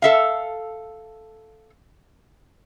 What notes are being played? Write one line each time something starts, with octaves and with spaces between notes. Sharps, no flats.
A4 E5 F5